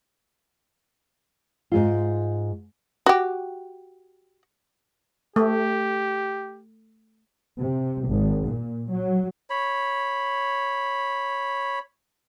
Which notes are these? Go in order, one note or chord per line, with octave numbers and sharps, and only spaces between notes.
G#2 G#3 F4
F#4 G4
A3 G4
C3
G#1
A#2
F#3
C#5 B5